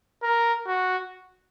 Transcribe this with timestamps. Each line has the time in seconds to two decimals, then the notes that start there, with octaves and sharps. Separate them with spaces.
0.23 A#4
0.67 F#4